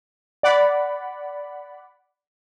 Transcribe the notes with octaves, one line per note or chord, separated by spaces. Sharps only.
D5 F#5 B5